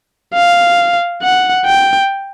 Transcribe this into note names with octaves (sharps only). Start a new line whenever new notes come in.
F5
F#5
G5